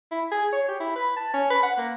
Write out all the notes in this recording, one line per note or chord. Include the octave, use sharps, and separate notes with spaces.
E4
G#4
C#5
G4
E4
B4
A5
C#4
B4
F#5
A#3